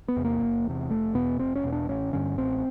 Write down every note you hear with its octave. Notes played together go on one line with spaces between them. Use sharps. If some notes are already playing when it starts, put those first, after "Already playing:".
B3
E2 C3
A#3
F#1
E2 C3
F1 A3
E2 B2 B3
F1 C4
C#4
E2 B2
D4
A1 C#4
G2 D3 C#4
A1 C4